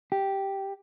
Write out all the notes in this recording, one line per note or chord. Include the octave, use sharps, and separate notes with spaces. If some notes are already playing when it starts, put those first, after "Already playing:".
G4